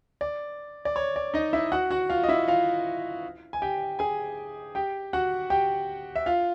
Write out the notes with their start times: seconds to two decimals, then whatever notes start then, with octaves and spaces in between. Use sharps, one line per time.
0.21 D5
0.85 D5
0.96 C#5
1.16 D5
1.34 D#4 D#5
1.53 E4 E5
1.72 F#4 F#5
1.91 F#4 F#5
2.10 F4 F5
2.23 D#5
2.29 E4 E5
2.48 F4 F5
3.53 G#5
3.62 G4 G5
3.99 G#4 G#5
4.75 G4 G5
5.13 F#4 F#5
5.50 G4 G5
6.15 E5
6.26 F4 F5